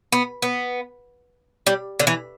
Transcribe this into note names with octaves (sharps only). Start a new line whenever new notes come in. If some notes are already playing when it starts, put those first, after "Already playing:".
B3
B3
G3
D3
E3